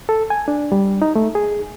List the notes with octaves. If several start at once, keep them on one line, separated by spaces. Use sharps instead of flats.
A4
G#5
D4
G3
D#4
A3
G#4